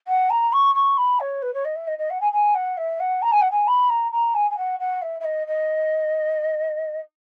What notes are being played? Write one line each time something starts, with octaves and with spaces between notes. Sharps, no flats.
F#5
A#5
C#6
C#6
B5
C#5
B4
C#5
D#5
E5
D#5
D#5
F#5
G#5
G#5
F#5
E5
F#5
A#5
G#5
F#5
G#5
B5
A#5
A#5
G#5
G#5
F#5
F#5
E5
E5
D#5
D#5